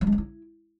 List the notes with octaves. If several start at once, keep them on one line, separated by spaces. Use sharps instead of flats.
F#3
G#3
C4
E4